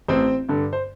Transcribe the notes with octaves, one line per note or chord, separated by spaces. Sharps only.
A1 C4 C5
G2 D3
C5